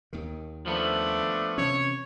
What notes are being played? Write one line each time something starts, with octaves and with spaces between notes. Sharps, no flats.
D#2 D#3
F3 A3 B3 D4
C3 E3 C#4 C#5